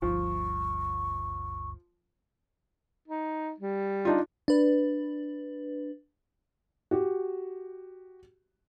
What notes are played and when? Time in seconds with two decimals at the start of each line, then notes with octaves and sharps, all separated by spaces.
0.02 G1 D2 G2 F3 C#6
3.08 D#4
3.60 G3
4.05 D4 D#4 F4
4.48 D4 B4
6.91 F#4 G4